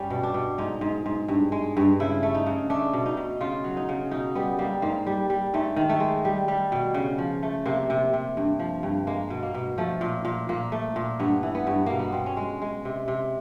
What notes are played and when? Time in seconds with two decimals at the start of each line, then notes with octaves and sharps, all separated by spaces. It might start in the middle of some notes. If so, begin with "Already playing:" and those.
Already playing: G2 G3 C#4
0.10 B2
0.23 D4
0.34 B2
0.58 G#2 D#4
0.81 G#2
1.06 G#2
1.28 G2
1.52 G#3
1.77 G2
2.00 C#3 E4
2.23 A3
2.35 D#4
2.47 C#3
2.70 A3 D4
2.93 B2
3.06 D#4
3.17 B2
3.41 C#3 F4
3.64 F#3
3.77 D#4
3.89 C#3
4.11 B2 D#4
4.35 G3 B3
4.59 G3 A#3
4.82 G#2 A#3
5.07 G3
5.30 G3
5.54 G#2 A3
5.76 D#3
5.89 A3
6.00 G#3
6.25 G3
6.48 G3
6.72 B2
6.94 C#3
7.18 F3
7.43 A3
7.66 C3 A#3
7.90 C3
8.13 C3
8.37 G2
8.59 F3
8.83 G2
9.07 G#3 A#3
9.30 B2
9.43 A#3
9.54 B2
9.78 F3 A3
10.01 A#2
10.25 A#2
10.49 A#2 A#3
10.72 A3
10.96 A#2
11.20 G2 B3
11.43 E3
11.55 B3
11.67 G2
11.86 B2 A#3
11.99 B3
12.12 B2 C4
12.26 C#4
12.37 G#3
12.62 G#3
12.85 C3
13.08 C3